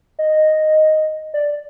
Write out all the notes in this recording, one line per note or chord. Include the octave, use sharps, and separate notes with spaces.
D#5
D5